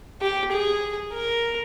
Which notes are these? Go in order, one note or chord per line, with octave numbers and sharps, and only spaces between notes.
G4
G#4
A#4